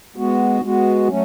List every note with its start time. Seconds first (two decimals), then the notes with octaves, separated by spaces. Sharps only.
0.16 G#3 B3 F#4
0.62 G#3 B3 F#4
1.08 F#3 A3 C#4